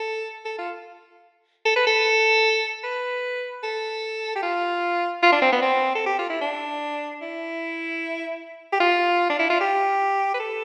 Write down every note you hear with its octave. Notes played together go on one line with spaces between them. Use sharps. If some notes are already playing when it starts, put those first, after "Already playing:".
Already playing: A4
A4
F4
A4
B4
A4
B4
A4
G4
F4
F4
D4
C4
B3
C4
A4
G4
F4
E4
D4
E4
G4
F4
D4
E4
F4
G4
B4
A4